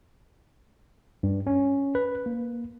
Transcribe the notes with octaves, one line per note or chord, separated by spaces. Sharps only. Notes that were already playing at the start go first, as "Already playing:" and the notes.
G2
C#4
B4
A#3